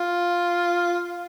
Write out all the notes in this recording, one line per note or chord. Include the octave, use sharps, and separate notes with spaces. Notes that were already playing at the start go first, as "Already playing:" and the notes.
Already playing: F4